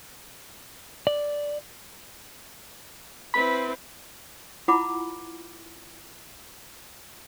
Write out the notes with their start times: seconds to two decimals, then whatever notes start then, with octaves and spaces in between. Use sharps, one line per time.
1.07 D5
3.34 C4 E4 B4 B5
4.68 E4 F4 F#5 A#5 B5 D6